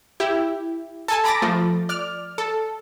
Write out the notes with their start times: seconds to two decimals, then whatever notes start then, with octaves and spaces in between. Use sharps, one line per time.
0.20 E4 G4
1.08 A4 G#5 A5
1.24 A#5 B5 D6 A6 A#6
1.42 F3 A3
1.89 D5 F6
2.38 A4